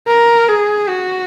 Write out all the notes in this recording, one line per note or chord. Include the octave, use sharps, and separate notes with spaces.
A#4
G#4
F#4